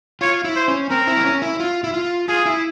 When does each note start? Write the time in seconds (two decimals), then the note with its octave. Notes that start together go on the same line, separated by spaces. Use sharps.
0.21 F4 C#5
0.45 E4
0.56 C5
0.68 C#4
0.91 C4 A#4
1.07 E4
1.17 C4
1.25 C#4
1.42 E4
1.60 F4
1.84 E4
1.94 F4
2.29 F4 G#4
2.46 E4